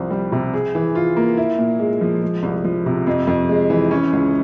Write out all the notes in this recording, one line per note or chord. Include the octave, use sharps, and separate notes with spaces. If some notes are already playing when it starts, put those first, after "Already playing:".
Already playing: C2 F3 C4
G3
C3
G#4
E3
F4
A#3
E4
A#2
G#3
F3
G#3
C2
F3
C3
F2
F2
G#3
E3
C#4
C#2